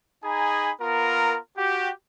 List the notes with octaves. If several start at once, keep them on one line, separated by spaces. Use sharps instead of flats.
D#4 G#4 G#5 A#5 B5
B3 F4 A#4
F#4 G4